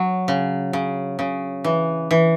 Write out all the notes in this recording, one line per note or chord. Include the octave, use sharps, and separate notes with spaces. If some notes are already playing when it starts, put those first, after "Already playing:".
Already playing: F#3
C#3
C#3
C#3
E3
E3